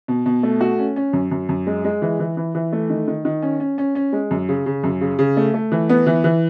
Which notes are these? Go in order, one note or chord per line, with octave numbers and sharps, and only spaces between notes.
B2
B2
A3
F#4
C#4
C#4
F#2
F#2
F#2
G#3
G#3
E3
E3
E3
E3
A3
D#3
D#3
D#3
C#4
C#4
C#4
C#4
G#3
F#2
C#3
C#3
F#2
C#3
C#3
A3
A3
E3
B3
E3
E3